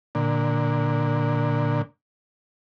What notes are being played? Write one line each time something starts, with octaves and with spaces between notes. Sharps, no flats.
A#2 D3